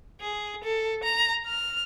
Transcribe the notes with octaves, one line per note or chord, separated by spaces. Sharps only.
G#4
A4
A#5
F6